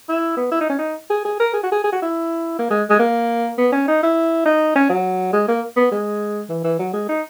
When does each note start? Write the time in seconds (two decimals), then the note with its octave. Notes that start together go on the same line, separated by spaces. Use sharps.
0.09 E4
0.37 B3
0.52 E4
0.61 D#4
0.70 C#4
0.79 D#4
1.10 G#4
1.25 G#4
1.40 A#4
1.54 G#4
1.63 F#4
1.72 G#4
1.84 G#4
1.93 F#4
2.02 E4
2.59 A#3
2.71 G#3
2.90 G#3
3.00 A#3
3.58 B3
3.73 C#4
3.88 D#4
4.03 E4
4.46 D#4
4.76 C#4
4.90 F#3
5.33 G#3
5.48 A#3
5.77 B3
5.92 G#3
6.50 E3
6.64 E3
6.79 F#3
6.93 G#3
7.09 D#4